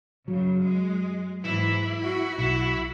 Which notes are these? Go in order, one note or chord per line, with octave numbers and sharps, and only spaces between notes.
F#2 C#3 F#3
G#3
G#2 E3 E4
F#4
B1 E4